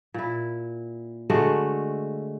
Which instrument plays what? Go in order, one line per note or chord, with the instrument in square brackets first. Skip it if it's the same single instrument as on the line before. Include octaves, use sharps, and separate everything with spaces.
[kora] A#2 E4
D3 G#3 A3 F#4